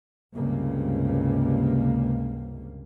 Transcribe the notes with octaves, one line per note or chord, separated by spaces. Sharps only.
C#2 G2 C3 A#3